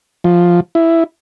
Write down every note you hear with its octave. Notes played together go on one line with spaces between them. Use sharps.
F3
E4